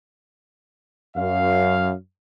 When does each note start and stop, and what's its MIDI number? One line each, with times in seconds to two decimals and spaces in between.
1.17 1.92 42
1.17 1.92 77